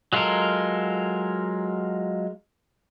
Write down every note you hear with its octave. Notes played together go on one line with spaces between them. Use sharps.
F#3 G#3 F4 A4 A#4